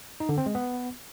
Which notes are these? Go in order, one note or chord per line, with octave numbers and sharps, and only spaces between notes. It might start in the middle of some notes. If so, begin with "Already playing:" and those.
D#4
D3
C4
G#3
B3